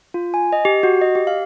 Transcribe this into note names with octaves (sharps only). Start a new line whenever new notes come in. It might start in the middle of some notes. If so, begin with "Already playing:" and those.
F4
G#5
D#5
G4
F#4
D#5
G4
F5